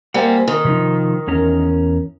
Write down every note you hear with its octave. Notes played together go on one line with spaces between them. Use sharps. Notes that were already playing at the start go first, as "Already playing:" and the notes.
G3 A#3 C4 F#5 G#5
D#3
C3 F3 D#4
E2 C#4 A#4